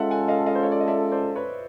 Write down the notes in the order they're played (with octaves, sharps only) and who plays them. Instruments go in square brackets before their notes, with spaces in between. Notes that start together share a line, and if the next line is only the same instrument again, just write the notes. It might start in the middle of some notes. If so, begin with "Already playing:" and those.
Already playing: [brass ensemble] G#3 C#4 F4 A4 [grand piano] E5 F#5
[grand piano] F#5 G#5
D#5 F5
D#5 F5
C5
C#5
D5
D#5
D5 E5
C5 D5
B4 C#5